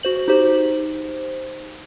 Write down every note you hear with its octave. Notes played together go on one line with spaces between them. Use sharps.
F#4 C5 F#7
D#4 G4 C5